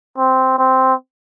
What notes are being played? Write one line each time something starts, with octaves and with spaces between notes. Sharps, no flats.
C4
C4